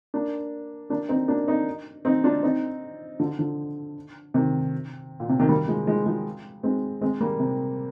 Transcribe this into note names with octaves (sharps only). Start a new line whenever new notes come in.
A#3 D4
A#3 D4
C4 D#4
A#3 D4
C4 D#4
C4 D#4
D4 F4
C4 D#4
D3 F3
D3 F3
C3 D#3
A#2
C3
C3 D#3
G3 A#3
F3 G#3
F3 G#3
F3 G#3
G#3 C4
G#3 C4
G3 A#3
C3